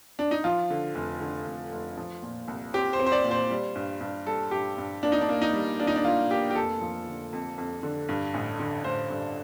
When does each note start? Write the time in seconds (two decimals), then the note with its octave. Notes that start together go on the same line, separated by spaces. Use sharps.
0.19 D4
0.31 D#4
0.44 F3 F4
0.70 D3
0.95 F1
1.21 D3
1.46 F1
1.72 F1
1.97 F3
2.22 A#2
2.48 C2
2.74 C4 G4
2.93 C5
3.00 C4
3.06 C5
3.12 D5
3.24 A#2
3.31 C5
3.50 G3
3.76 G2
4.01 G2
4.26 G3 A4
4.51 G2 G4
4.78 G2
5.03 A#3 D4
5.12 D#4
5.21 D4
5.29 A#3
5.42 D#4
5.53 G3
5.80 A#3 D4
5.87 D#4
5.96 D4
6.04 A#3 F4
6.31 A#3 G4
6.50 G4
6.55 F1 A4
6.81 F3
7.07 D3
7.33 F2
7.58 F2
7.83 D3
8.09 G2
8.34 A1
8.60 D3
8.84 A1 C5
9.10 G2